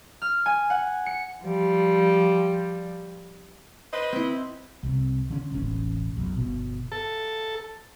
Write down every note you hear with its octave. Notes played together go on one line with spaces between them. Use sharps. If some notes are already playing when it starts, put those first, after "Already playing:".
F6
G#5
F#5
C#7
F3 G3
B4 C5 D#5
C4 E4
C2 C3
D3 C#4
E1 A1 C#4
B1 F#2
G1 B2
A4